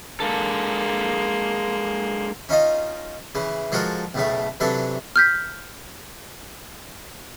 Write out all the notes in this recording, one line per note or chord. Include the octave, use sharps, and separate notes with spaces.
G#3 A#3 D4 A4
C#4 D#4 F4 D#5
C#3 E3
F3 G#3 F#4 A4 A#4
B1 A2 C#3 A3
C3 E3 F#3 D4 A4
F6 G6 B6